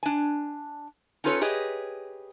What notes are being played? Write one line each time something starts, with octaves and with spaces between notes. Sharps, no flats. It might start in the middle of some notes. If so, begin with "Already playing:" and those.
D4 G#5
C#4 D#4 F4 A4 B4 C#5
G4 G#4 B4 C#5 D#5